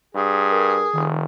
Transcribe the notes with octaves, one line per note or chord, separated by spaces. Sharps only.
G2 G#4
A#4
F1 D#3